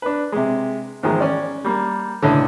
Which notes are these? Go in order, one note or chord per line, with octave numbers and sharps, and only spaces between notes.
D4 B4
C3 G#3
E2 G#2 D#3 F3 G#3
C#4 D5
G3 A#3
C#2 A2 D3